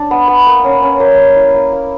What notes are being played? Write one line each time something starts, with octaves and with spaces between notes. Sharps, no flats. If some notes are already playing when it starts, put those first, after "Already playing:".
Already playing: D4
B3
B3
A#3
C#4
C#4
A#3
A#3
E4
A#3
A#3